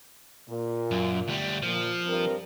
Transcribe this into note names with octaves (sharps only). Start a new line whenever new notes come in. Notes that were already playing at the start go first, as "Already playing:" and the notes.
A#2
F#2
D2 G3
A#2 F3
G2 C4 A#4